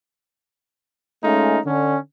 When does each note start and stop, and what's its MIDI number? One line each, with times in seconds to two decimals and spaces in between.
1.24 1.58 56
1.24 1.58 57
1.24 1.58 61
1.24 1.58 63
1.24 1.58 65
1.66 1.97 50
1.66 1.97 61